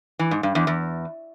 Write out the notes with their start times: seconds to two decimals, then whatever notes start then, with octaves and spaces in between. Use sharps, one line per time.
0.19 E3
0.31 G#2
0.43 G2
0.55 E2
0.67 E2